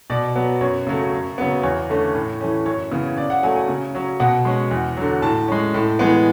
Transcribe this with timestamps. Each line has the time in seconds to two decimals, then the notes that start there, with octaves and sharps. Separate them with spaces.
0.10 B2 D5
0.36 F#3 B3
0.61 F#2 C#5
0.87 C#3 F#3 A3
1.12 F#2
1.38 C#3 F#3 B3
1.63 E2 C#5
1.89 D3 A3 C#4
2.15 A2
2.41 E3 A3 C#4
2.66 F#2 C#5
2.91 C#3 E3 B3
3.17 C#3 D5
3.30 F#5
3.43 F#3 A3 G#5
3.56 G#5
3.68 C#3
3.95 F#3 C#4
4.20 B2 F#5
4.45 G#3 C#4
4.71 E2
4.97 D3 F#3
5.22 A2 A5
5.48 G#3 C#4
5.74 A2
5.99 E3 G#3 B3